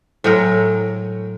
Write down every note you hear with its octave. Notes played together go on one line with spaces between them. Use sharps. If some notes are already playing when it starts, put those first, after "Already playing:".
A2 F#3 G#3 A#4